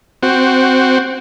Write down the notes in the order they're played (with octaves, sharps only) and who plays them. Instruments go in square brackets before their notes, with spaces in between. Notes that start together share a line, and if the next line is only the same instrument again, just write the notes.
[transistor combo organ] C4 F#4